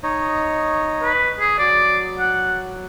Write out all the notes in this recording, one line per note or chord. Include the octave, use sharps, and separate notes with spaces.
D#4 C#5 D#5
B4
G#4
F#3 D5
F#5